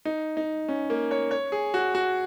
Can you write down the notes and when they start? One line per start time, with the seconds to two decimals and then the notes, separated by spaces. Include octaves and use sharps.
0.05 D#4
0.37 D#4
0.69 C#4
0.90 A#3
1.11 C#5
1.31 C#5
1.52 G#4
1.74 F#4
1.95 F#4